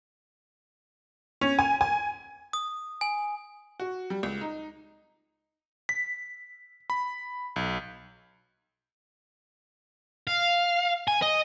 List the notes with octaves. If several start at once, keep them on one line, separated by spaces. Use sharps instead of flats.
C#4
G#5
G#5
D#6
G#5
F#4
G3
C#2
D#4
B6
B5
B1
F5
G#5
D#5